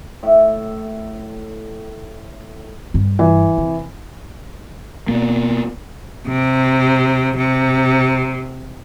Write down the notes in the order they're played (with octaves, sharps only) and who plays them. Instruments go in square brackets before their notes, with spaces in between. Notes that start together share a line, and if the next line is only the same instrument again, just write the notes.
[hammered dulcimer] A2 E5
[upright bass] G2
[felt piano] E3
[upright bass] C3
[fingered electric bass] B2 A#3
[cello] C3
C3